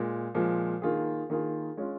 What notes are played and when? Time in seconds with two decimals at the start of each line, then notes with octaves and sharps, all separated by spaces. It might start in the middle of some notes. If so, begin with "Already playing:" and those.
Already playing: A#2 G#3
0.34 A#2 F3 G#3
0.82 D#3 A#3 F4 G#4
1.30 D#3 A#3 F4 G#4
1.77 G#3 C#4 F4